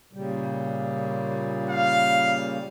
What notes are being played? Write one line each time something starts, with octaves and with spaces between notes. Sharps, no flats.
A#2 C#3 G3
F5